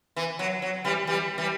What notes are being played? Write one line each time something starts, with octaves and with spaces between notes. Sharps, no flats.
E3
F#3
F#3
E3 G3
E3 G3
E3 G3